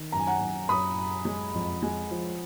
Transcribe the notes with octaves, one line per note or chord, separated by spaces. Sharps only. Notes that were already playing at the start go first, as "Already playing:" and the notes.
Already playing: D#3
F#2 A#5
G#5
F#5 A#5
F#2
F#2 B5 D#6
F#2
G#3
F2
G#3
F3